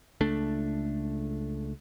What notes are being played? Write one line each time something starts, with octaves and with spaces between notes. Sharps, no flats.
C#2 A3 D4